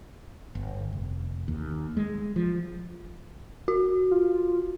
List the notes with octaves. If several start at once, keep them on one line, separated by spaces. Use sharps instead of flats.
G1
F1
D#2
G#3
F3
F#4
F4